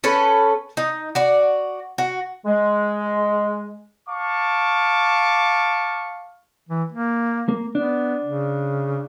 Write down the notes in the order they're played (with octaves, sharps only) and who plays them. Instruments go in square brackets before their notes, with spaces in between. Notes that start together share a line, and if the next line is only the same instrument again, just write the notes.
[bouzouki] C#4 A4 B4
D#4
F#4 D5
F#4
[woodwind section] G#3
[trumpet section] F5 A5 C#6 D6
[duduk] E3
A#3
[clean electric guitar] A#3
[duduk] B3 [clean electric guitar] D4
[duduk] C#3